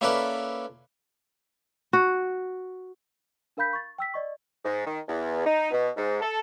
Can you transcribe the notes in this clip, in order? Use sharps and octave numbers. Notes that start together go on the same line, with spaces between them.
A#3 C#4 E4 A4 B4 D5
F#4
D4 A#4 F5 B5 G6 B6
C#6 A6
G5 E6 B6
D5 D#5 C#6
G#2
D#3
E2
D#4
B2
G#2
A4